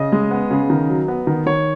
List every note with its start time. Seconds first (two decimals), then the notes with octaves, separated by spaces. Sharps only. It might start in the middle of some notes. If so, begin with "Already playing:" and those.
Already playing: C#3 D#5
0.12 G#3
0.31 B3
0.51 C#3
0.70 D#3
0.89 F#3
1.08 B3
1.27 D#3
1.46 D#3 C#5